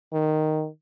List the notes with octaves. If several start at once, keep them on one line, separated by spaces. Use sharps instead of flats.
D#3